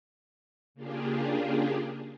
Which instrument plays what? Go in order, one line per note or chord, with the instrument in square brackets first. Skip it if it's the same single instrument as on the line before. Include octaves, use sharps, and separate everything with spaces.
[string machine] C#3 A#3 D4 F4 G4 G#4